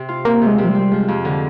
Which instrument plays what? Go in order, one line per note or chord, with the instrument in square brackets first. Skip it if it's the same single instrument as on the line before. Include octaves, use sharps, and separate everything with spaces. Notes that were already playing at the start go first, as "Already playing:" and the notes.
Already playing: [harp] C3
F4
[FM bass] A#3 [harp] C4
[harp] C3
[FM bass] G#3
[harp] C3
[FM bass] F3
G3
[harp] C4
[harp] F3 [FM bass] G#3
[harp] F2
D3